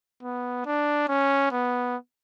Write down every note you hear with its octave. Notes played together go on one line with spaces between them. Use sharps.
B3
D4
C#4
B3